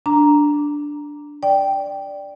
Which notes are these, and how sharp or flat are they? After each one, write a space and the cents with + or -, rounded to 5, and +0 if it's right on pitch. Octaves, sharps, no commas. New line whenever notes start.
D4 +0 A#5 +0
D5 +0 G5 +0